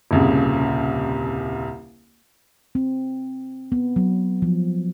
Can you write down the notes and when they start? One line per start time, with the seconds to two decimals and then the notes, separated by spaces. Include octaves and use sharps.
0.11 D#1 C2 C#3
2.75 C4
3.72 B3
3.96 F#3
4.42 F3